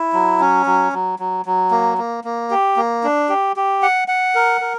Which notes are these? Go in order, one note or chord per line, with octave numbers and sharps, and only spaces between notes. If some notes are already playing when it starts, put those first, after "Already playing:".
Already playing: E4
F#3
C#4
F#3
F#3
F#3
F#3
A#3
A#3
A#3
G4
A#3
D4
G4
G4
F#5
F#5
A#4
A#4